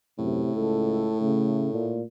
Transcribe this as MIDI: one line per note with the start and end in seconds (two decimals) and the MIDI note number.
0.19 0.44 42
0.19 2.06 45
0.19 0.52 48
0.55 1.10 37
0.55 1.17 69
1.21 1.72 49
1.21 1.95 57
1.74 2.02 46